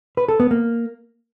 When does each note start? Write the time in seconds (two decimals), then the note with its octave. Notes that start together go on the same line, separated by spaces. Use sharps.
0.17 B4
0.28 A4
0.40 B3
0.51 A#3